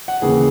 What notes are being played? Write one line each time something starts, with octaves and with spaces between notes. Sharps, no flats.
F#5
D#2 C#3 E3 G#4